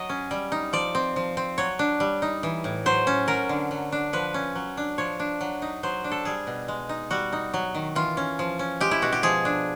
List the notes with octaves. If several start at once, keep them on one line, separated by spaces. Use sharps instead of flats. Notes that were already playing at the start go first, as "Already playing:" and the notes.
Already playing: F#3 D#5
C#4
G3
D#4
F3 D5
C4
F3
C4
F#3 C#5
D4
G3
D#4
E3
A2
F#3 C5
C#4
F#3 A#4
D3
F#3
D4
F3 B4
C#4
F#3
D4
F3 C#5
D4
F#3
D#4
F#3 C5
D4
A4
G3 G#4
B2
G#3
D#4
G3 F#4
D#4
F#3
D#3
E3 F4
C#4
F3
C#4
G#3 G4
E4
B2 F#4
G4
F3 G#4
D4